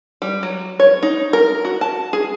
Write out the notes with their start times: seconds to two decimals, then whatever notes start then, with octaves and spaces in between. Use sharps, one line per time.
0.22 G3
0.43 F#3
0.79 C#5
1.03 D#4
1.33 A#4
1.65 F#4
1.81 A5
2.13 G#4